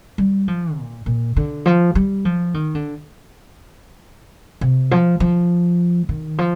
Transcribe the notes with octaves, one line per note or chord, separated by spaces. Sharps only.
G3
F3
A#2
A#2
D3
F3
G3
F3
D#3
D3
C3
F3
F3
D#3
F3